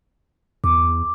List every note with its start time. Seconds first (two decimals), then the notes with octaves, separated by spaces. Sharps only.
0.64 E2 D6